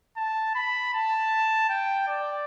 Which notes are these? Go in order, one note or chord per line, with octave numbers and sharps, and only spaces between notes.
A5
B5
A5
G5
D5